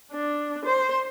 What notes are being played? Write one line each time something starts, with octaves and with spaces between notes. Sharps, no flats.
D4
C5